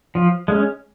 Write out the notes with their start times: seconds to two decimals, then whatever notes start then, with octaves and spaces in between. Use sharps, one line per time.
0.15 F3
0.48 G#3 C#4